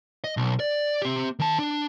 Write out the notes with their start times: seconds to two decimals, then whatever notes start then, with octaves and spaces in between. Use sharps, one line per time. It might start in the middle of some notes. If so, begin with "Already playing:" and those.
0.24 D#5
0.37 B1
0.60 D5
1.02 C4 G4
1.39 D#3 A5
1.59 D4